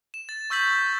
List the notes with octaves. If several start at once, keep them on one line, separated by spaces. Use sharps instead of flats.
E7
A6
C#6 E6 G6 B6 F#7